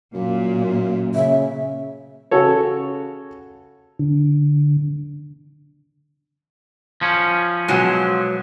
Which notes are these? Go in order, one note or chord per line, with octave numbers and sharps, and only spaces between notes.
F#2 A#2
C#3 E5
C#3 F#4 A4 C#5
D3
F3 C#4
B2 F#3 G#3